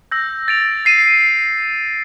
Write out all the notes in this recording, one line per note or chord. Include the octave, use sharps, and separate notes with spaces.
E6 G6 A#6
A6 D7 F7
A6 C7 D#7